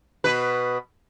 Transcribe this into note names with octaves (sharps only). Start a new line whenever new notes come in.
B2 B4